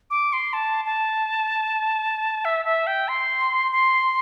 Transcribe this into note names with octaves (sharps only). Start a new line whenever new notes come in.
D6
C6
A5
A5
E5
E5
G5
C6
C6